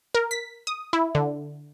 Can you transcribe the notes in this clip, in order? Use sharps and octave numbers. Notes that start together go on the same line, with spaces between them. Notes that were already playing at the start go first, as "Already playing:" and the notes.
A#4
B6
D#6
E4
D3